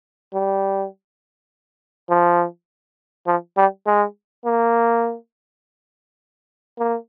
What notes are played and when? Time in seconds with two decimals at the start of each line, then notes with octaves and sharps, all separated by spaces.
0.33 G3
2.10 F3
3.27 F3
3.57 G3
3.86 G#3
4.45 A#3
6.78 A#3